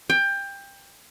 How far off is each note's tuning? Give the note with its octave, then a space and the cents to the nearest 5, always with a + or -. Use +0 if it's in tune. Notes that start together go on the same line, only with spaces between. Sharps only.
G5 +20